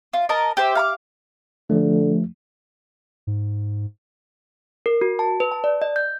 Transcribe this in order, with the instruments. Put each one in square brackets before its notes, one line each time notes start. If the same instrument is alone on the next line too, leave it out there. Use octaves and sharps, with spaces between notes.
[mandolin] F4
A#4 D#5 A5 A#5
G4 C5 E5
F5 A#5 D6
[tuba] D3 [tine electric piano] F3 A3
[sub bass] G#2
[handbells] A#4
F#4
A5
B4
A5
D5
D#5
G6